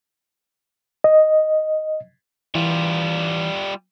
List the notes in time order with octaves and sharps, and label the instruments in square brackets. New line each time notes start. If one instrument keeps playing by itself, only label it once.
[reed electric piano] D#5
[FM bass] E3 [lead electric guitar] G3 F4